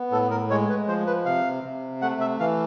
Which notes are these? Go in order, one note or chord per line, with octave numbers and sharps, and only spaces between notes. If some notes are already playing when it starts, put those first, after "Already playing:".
Already playing: B3
A2 A4
A#4
G#3 C#5
B4
F3 C5
B4
C3 F5
C3
A3 F#5
E5
E3 F5